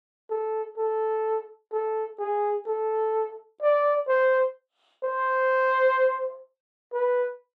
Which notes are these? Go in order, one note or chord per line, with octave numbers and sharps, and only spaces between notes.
A4
A4
A4
G#4
A4
D5
C5
C5
B4